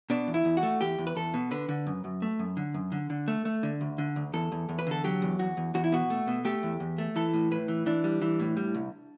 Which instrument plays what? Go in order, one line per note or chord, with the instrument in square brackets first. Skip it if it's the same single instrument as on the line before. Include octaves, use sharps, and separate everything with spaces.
[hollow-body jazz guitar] B2 D4
E2
E4
E2
F#4
A3
E2 G4
E2
B4
E2 A4
B2
D3 B4
D3
F#2
F#2
A3
F#2
D3
F#2
D3
D3
A3
A3
D3
D2
D3
D2
E2 A4
E2
E2
B4
D3 A4
F#3 G4
E2
E2 F#4
E2
E2 F#4
E4
B2 F#4
A3
B2
A3 G4
E2
E2
A3
E3 A4
A2
A2 B4
E3
E3 D4
G3
E3
A2
G3
C2